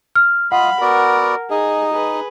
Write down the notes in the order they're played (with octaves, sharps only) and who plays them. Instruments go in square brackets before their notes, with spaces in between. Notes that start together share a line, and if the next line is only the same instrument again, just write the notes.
[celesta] F6
[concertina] F4 D#5 [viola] F5 B5 [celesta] F#5
[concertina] B3 F#4 D5 [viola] A#4
[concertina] D#4 D#5 [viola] G#4
[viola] G#4 B4